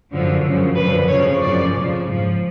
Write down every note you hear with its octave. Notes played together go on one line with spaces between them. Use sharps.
F#2 D3 F3
F#2 C#3 F3
F#2 D3 F3 B4
F2 C#3 F3 C#5
F#2 C#3 F3 D5
F2 C#3 F3
G#2 F3